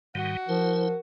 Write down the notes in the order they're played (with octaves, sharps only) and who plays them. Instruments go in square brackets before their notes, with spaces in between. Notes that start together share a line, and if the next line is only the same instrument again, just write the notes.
[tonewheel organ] G#2 D#3 G3 [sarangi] F#4
[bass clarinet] F3 [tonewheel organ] E4 C5 [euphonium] A#4